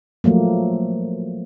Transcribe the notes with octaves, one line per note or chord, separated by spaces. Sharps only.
F3 F#3 A3 A#3